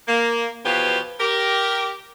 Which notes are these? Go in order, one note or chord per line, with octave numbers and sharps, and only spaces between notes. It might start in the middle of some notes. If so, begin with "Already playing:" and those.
A#3
E2 B2 F3 G4 B4 C#5
G4 A#4